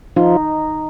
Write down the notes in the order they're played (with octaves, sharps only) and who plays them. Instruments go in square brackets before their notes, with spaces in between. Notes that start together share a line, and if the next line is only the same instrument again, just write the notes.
[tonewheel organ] F3 F4 [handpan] D#4